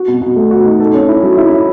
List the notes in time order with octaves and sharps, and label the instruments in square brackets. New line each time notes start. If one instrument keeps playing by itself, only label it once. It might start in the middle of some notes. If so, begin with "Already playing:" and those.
Already playing: [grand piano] F#4
B2
B2
A3
F#4
D#4
A4
C#4
E4
F#3
E4
E4